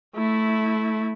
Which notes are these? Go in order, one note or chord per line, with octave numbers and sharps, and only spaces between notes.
A3 E4